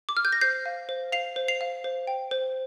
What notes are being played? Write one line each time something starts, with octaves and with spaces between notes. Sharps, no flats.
D6
F6
G6
A#6
C5 G6 C7
F5
C5
F5 C7 F7
C5
C7 F7
F5
C5
G5
C5